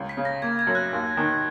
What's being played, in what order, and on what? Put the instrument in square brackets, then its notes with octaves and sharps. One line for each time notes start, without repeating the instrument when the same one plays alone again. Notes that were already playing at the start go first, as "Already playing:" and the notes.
Already playing: [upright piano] C#2 C#4
[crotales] B6
[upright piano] C#3
[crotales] A#6
[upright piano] A#3 [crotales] G#6
[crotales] G#6
[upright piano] F#2
[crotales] F#6
[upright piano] D#2
D#3